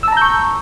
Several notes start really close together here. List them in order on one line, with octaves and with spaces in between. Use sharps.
E6 A5 A#5 G6 C#6